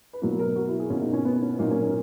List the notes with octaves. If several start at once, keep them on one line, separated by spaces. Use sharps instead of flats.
B4
B2 F#3 A#3 A#4
A#4
F#4
E4
G#4
B2 A#3 C#4
D#4
C#4
B3
C#4
A#2 F#3 A#3 D#4
C#4
C#4